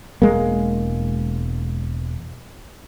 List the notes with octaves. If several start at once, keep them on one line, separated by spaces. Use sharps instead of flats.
E1 G#3 A#3